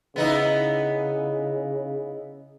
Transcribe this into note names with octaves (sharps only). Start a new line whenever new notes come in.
C#3 B3 D#4 E4